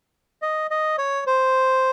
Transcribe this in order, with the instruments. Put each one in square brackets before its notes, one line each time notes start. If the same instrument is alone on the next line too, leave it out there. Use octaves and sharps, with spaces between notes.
[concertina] D#5
D#5
C#5
C5